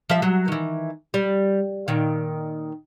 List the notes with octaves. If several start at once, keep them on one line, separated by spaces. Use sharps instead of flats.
F3 E5
F#3
D#3 E3
G3
A#2 D#3